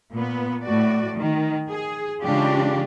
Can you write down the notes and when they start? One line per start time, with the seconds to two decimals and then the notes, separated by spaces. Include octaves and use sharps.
0.13 A#2 B3
0.63 A2 A3 F#4 D5
1.17 D#3
1.69 G#4
2.22 C#3 E3 G#3 D4 F4 G4